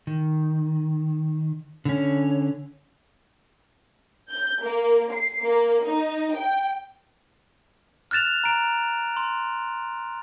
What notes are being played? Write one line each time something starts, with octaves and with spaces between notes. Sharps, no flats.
D#3
D3 C#4
G6
A#3
C7
A#3
D#4
G5
F6 F#6 A6 E7 F7
A#5 D7
C6